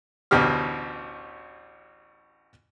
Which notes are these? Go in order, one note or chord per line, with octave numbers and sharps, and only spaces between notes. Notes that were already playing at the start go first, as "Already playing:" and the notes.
A1 D2 B2 G4 F6